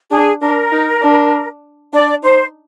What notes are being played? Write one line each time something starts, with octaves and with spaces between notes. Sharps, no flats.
D4 G#4
D4 A#4
D#4
D4
D4 D5
D#4 C5